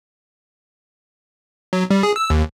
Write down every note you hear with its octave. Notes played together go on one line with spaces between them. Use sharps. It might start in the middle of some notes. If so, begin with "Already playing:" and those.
F#3
G3
G#4
E6
D#2